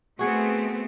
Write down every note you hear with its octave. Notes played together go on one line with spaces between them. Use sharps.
A3 B3 C4 F#4 G#4 F#5